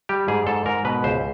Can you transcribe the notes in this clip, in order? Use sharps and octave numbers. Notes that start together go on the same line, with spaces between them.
G3 G4
G#2 G#4
G#2 A4
G#2 A#4
B2 B4
C#2 C5